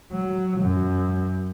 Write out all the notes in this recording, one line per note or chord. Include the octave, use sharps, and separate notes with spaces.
F#3
F#2